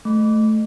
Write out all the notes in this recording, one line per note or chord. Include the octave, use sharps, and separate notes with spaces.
A3